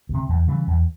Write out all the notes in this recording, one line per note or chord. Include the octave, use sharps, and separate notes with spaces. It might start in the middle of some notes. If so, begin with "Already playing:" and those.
D2 C3
E2
C#3 E3 G3
E2